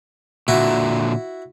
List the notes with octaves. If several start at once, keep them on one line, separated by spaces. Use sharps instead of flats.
A#2 D3 E4 F#4